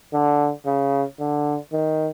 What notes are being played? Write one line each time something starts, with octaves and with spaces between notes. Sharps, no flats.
D3
C#3
D3
D#3